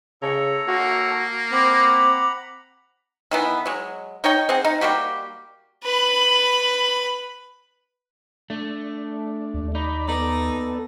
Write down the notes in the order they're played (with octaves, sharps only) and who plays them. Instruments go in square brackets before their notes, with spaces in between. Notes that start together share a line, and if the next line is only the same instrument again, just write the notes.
[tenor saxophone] C#3 [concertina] A4 C#5 A#5
[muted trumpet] A#3 [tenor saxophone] F#4
[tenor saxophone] C4 [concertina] F#5 A#5 B5 [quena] D6
[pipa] D#3 E3 B3
F#3 G#3
D#4 C#5 D#5 G5
C4 G#4 F#5
D#4
G3 A#3 F#4 G4
[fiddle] B4 B5
[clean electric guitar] A3 [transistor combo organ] D4
[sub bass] D#2
[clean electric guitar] D#4 [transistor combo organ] D5 B5
[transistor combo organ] B3 A4 [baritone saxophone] D#4 [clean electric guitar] D5